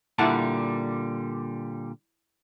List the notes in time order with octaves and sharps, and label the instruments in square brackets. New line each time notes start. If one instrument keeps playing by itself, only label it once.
[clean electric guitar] A#2 D3 G3 [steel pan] E4 F#5 A5